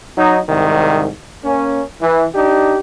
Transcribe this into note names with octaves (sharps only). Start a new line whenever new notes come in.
F#3 D#4
C2 G#2 D#3
A#3 C#4
E3
D4 D#4 G4